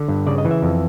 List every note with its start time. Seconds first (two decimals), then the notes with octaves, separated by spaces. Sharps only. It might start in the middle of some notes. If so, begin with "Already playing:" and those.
Already playing: D3
0.08 G2
0.26 C#3 D5
0.38 D#5
0.45 E3
0.51 E5
0.63 F2